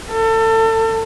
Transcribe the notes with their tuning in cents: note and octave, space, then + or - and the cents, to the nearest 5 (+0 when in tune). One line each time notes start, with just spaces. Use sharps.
A4 +30